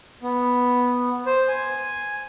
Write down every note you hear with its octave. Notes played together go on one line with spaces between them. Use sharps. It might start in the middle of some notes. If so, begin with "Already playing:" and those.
B3
C5
G#5